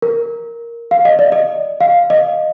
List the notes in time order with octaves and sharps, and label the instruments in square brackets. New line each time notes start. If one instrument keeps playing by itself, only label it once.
[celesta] A#4
F5
D#5
D5
D#5
F5
D#5